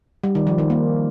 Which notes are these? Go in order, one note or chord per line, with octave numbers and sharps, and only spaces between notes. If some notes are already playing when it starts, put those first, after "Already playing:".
G3
D#3
F3
D#3
A#3